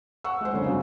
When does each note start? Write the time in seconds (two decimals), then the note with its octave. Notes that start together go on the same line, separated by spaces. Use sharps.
0.24 F#5 C#6 E6
0.41 G#3 C5
0.53 F#1 D3 C#4
0.65 G2 C#3 F#3